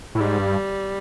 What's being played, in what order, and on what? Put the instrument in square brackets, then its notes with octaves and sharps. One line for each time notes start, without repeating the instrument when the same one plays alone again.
[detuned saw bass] A2
[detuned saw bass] G#2 [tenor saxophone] G3
[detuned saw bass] G2